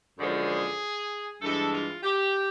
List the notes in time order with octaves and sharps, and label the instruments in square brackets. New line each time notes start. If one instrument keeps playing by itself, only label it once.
[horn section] F#2 D3 F3 G#3 G#4
G2 E3 G#3 A4
F4
G4